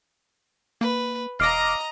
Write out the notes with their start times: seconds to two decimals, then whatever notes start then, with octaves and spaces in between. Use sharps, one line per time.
0.81 A#3 B4
1.40 E1 D#5 F5 A#5 D6 A#6